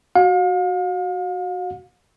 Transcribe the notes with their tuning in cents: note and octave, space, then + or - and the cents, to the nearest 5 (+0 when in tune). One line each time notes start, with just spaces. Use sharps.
F#4 +0 F5 +40